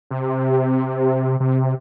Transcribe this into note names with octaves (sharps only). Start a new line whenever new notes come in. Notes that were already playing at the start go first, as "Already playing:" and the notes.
C3
C3